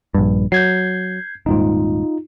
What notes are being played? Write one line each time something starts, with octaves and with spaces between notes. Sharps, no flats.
A#1 G2
F#3 G6 G#6 C7
D#1 G#2 D#4 F4